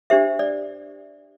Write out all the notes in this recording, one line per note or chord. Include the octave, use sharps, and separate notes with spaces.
D4 G4 C5 E5
D5